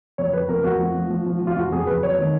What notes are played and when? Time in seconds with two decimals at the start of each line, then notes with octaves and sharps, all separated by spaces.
0.18 F2 C#5
0.33 F2 B4
0.49 F2 A#4
0.64 F2 F#4
0.79 F3
0.95 F3
1.10 F3
1.26 F3
1.42 F3
1.47 F4
1.56 F2 F#4
1.72 F2 G#4
1.87 F2 B4
2.02 F#3 C#5
2.18 D#3